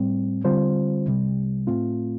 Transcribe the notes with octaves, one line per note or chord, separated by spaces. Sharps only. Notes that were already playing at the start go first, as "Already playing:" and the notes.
Already playing: A2 G3 C4
D3 G3 C4 F4 C5
C2 C3 G3
A2 A3 C4 F4